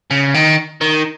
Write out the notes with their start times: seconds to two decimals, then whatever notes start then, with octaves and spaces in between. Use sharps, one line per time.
0.11 C#3
0.34 D#3
0.81 D#3